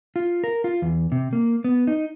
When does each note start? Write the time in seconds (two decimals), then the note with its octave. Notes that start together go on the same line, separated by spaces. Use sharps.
0.16 F4
0.44 A#4
0.64 F4
0.82 E2
1.12 C3
1.33 A#3
1.64 B3
1.87 D#4